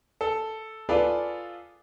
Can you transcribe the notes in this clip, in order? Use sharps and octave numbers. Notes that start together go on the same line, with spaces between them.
A4
F4 G#4 A4 B4 D5 F5